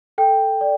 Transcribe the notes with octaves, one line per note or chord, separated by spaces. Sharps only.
A4 G5
D5